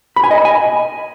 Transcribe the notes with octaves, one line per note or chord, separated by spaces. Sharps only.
B5
G#5
D#5
B5
G#5